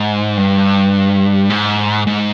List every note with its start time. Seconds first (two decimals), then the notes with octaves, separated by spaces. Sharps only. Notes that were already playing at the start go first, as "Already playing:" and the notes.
Already playing: G#2
0.37 G2
1.50 G#2
2.07 G#2